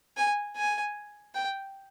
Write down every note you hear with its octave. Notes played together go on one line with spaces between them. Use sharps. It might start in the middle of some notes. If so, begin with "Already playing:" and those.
G#5
G#5
G5